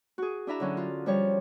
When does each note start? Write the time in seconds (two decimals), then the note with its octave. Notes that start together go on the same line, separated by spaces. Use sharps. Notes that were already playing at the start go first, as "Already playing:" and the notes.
0.18 F#4 G#4
0.47 D4 E4 E5 A#5
0.60 D3 F#3 C#4
0.77 F4
1.06 F3 G3 C#5